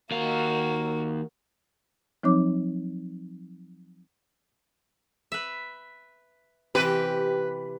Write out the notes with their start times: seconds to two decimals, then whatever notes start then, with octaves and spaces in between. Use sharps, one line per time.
0.11 D#2 A#3 F#4 F5
2.23 F3 F#3 C4 D#4 C#5 D6
5.32 B4 E5
6.75 C3 E3 G4 B4